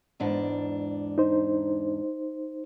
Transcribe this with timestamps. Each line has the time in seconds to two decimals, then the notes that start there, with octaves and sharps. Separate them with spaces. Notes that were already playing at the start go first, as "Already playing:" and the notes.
0.20 E2 G#2 D4
1.18 D#4 C5